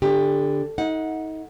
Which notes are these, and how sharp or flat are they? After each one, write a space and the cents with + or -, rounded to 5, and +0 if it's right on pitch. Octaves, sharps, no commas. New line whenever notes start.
D3 +0 G4 +20
D#4 +30 F#5 -15